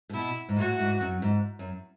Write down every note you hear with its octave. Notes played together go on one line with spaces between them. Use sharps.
A2
B2 E4
G#2
A2 F#4
G#2
F#2
G#2
F#2